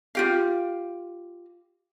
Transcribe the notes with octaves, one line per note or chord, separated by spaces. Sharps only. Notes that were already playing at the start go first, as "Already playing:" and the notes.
F4 G4 F5